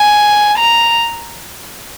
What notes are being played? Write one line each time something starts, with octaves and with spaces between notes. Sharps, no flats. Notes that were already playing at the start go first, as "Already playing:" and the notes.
Already playing: G#5
A#5